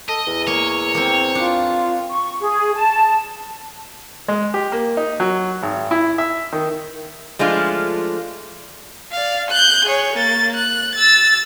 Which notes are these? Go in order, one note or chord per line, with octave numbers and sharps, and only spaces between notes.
A4 D#5
E2
A#3 C#5
A#3 C4
D4 F4
C#6
G#4
A5
G#3
G4
A#3
D#4
F#3
G#1
E4
E5
D#3
F3 G#3 A3 D4 F4
D5 F5
F#6 G6
G#4 C#5
A#3 A6
F#6
E6 A6